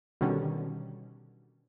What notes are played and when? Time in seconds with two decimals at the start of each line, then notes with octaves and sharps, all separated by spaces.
0.21 B2 D3 D#3 G3 C#4